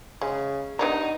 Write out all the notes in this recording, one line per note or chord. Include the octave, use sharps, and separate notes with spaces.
C#3 G#3
G2 B3 D4 D#4 A#4